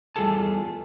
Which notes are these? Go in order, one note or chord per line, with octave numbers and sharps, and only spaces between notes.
E2 G3 F4 G#4 A4 A5